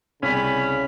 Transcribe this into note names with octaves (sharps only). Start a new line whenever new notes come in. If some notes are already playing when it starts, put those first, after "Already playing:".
C2 C#3 C#4 B5